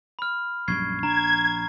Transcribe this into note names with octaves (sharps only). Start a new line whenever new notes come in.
B5 F6
A#1 F#2 G3 C#6 G#6 C7
A#1 D4 A#5 G#6